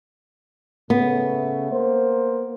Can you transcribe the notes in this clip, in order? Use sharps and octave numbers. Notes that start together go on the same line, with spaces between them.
C#3 A3 B3
A#3 C5